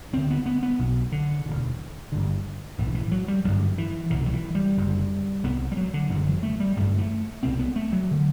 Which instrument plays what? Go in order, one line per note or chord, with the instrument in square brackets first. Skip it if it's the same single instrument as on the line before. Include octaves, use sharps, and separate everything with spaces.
[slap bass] D2 D3 C4
B3
B3
B3
B1 B2
D3
E1 D2 D3
G1 G2 D3
B1 A2 E3
E3
F#3
G3
A1 G2 D3 F#3
E3
C2 B2 D3
F#3
E3
G3
F#1 F#2 D3
C2 C3 B3
G3
F#3
D3
F#1 F#2 D3 E3
F#3
A3
G3
A1 G2 D3 A3
A3
C2 B2 C4
B3
A3
F#3
D3